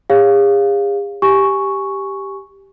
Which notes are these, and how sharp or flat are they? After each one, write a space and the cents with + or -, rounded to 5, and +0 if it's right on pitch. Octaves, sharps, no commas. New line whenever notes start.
G#4 -45 C#5 +0 F5 +0
G4 +0 G#5 +5 C#6 +0